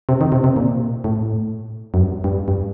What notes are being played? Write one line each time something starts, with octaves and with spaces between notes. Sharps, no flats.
C3
D#3
C3
C3
A#2
A2
F#2
G2
G2
G2